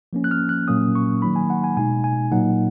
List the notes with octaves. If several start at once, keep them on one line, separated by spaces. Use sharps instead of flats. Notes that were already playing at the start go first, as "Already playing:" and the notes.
F3 A#3 C#4
F#6
F6
F#6
A#2 F#3 A#3 C#4 D#6
C#6
D#3 F#3 A#3 D#4 B5
G#5
F#5
G#5
B2 G#3 D#4 G#5
G#5
A#2 F#3 A#3 D#4 F#5